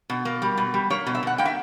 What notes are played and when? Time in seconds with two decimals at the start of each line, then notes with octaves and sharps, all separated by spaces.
0.10 B2
0.25 A#3
0.42 G3
0.57 B2
0.74 G3
0.90 A#3 C#5
1.07 B2
1.15 E5
1.23 B2 F#5
1.38 A#3 G5
1.45 E5